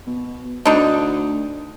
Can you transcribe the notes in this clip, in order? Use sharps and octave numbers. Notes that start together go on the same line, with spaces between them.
B2
D2 D4 D#4